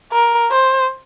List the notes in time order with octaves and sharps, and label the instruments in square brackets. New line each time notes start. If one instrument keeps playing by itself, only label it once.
[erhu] A#4
C5